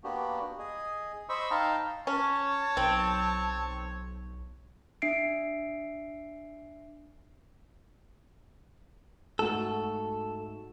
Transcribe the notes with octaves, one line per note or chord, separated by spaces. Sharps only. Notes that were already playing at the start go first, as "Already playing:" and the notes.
A#3 B3 D4 F#4 G4
G#4 D#5
C5 D#5 B5 C#6 E6
D#4 F5 G5 A5 A#5
C#4 C#5 A5
B1 C4
D4 E5 C7 D7
G#2 A3 F#4 A4